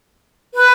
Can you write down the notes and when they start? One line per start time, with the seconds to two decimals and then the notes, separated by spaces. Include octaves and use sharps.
0.55 B4